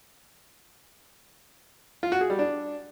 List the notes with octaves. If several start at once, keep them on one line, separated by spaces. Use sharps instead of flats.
F4
F#4
G#4
G3
D4